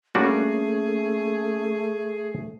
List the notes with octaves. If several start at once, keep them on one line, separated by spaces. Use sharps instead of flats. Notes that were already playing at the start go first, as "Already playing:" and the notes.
G3 A3 A#3 C#4 D4 F#4 G#4 C#5